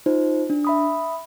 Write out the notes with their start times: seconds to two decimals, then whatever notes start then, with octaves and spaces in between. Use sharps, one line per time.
0.06 D#4 F4 C5
0.50 D4
0.65 E5 B5 D#6